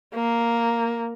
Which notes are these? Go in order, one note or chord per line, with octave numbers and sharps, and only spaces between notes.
A#3